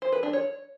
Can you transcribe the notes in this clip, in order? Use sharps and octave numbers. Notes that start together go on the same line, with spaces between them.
C5
B4
D4
C#5